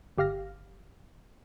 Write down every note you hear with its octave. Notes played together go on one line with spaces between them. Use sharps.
G1 G4 F5 F6 A#6